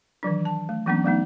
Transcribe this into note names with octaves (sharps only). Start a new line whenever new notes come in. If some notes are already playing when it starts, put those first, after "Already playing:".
D#3 E3 F#3 D4
A5
A3
E3 F#3 A#3 B3 C#4 D4
F#3 A3 B3 D#4